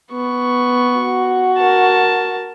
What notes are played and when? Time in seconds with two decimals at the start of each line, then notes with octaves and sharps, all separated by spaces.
0.11 B3 C#6
1.00 F#4
1.57 A#4 A5